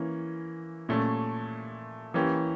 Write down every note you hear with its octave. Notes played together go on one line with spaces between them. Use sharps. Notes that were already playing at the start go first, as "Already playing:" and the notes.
Already playing: E3 A#3 C#4
A#2 A3 C#4
E3 A#3 C#4 G4